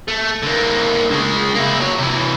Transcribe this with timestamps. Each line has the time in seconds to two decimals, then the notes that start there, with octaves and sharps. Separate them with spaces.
0.08 A3
0.43 D3 A#3
1.11 C#3 G#3
1.55 A#3 E4
1.81 F#4 C#5
1.99 C3 E3